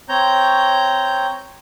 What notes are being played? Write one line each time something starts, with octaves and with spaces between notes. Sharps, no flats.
C4 C#5 A#5 G6